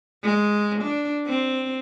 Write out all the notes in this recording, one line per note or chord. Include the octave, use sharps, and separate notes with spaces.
G#3
D4
C4